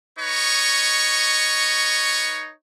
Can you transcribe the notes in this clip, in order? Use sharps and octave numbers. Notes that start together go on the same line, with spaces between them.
D#4 B4 C#5 D#5 C#6